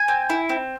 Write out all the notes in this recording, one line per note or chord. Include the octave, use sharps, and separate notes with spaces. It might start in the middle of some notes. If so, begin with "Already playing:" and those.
Already playing: G#5
C4
E4
C4